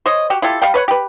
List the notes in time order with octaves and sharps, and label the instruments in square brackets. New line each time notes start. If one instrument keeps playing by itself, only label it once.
[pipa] C5 C#5 D#5
F#4 G4
E4 F4 G4 A4
G3 F5 G5
B4 C#5 F#5
G4 B4